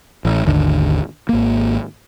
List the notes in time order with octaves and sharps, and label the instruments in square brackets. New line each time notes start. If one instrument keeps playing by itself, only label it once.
[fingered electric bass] A1
G#1 D#2 D3
G#1 A#3